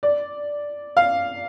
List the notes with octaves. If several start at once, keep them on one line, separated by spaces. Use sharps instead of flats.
D5
F5